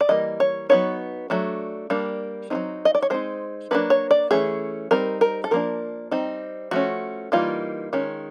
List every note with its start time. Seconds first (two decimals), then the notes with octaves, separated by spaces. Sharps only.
0.01 D5
0.09 E3 G3 A#3 D#5
0.40 C#5
0.69 F#3 B3 D#4 C#5
1.30 F#3 A3 D4
1.90 G3 A#3 D4
2.50 F#3 A3 C4 D#4
2.85 D#5
2.95 D5
3.02 C#5
3.10 G#3 C4 D#4 C5
3.71 F#3 A#3 D4 B4
3.90 C#5
4.11 D5
4.31 E3 A3 C#4 G#4
4.91 G3 C4 D#4 A#4
5.21 A#4
5.44 A4
5.51 F3 A#3 D4 A#4
6.11 G3 C4 D#4
6.71 F3 A3 C#4 F#4
7.32 E3 G3 A#3 D#4 F4
7.93 D#3 G#3 C#4